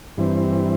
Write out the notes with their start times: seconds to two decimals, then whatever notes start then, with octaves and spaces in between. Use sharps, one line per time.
0.17 G2 E3 C4